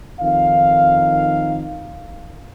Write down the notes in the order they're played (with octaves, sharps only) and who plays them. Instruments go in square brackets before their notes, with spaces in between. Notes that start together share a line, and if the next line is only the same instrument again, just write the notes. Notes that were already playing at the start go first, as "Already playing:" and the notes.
[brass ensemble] F2 D#3 D#4 F5